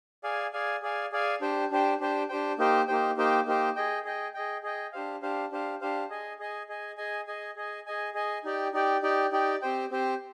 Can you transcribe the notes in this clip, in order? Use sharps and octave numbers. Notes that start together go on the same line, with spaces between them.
G#4 D5 F5 G#5
G#4 D5 F5 G#5
G#4 D5 F5 G#5
G#4 D5 F5 G#5
D4 G4 C5 G5
D4 G4 C5 G5
D4 G4 C5 G5
D4 G4 C5 G5
A#3 D#4 G4 C5 G5
A#3 D#4 G4 C5 G5
A#3 D#4 G4 C5 G5
A#3 D#4 G4 C5 G5
G#4 D#5 G5
G#4 D#5 G5
G#4 D#5 G5
G#4 D#5 G5
D4 G4 C5 F5
D4 G4 C5 F5
D4 G4 C5 F5
D4 G4 C5 F5
G#4 D#5 G#5
G#4 D#5 G#5
G#4 D#5 G#5
G#4 D#5 G#5
G#4 D#5 G#5
G#4 D#5 G#5
G#4 D#5 G#5
G#4 D#5 G#5
D#4 G4 D5 G5
D#4 G4 D5 G5
D#4 G4 D5 G5
D#4 G4 D5 G5
C4 G4 C5 G5
C4 G4 C5 G5